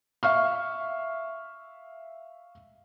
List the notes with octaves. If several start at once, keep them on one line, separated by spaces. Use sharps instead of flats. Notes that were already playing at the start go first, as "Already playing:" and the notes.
E5 F5 C#6 F6